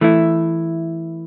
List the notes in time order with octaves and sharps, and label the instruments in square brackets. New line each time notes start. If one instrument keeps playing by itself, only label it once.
[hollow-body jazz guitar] E3 A3 E4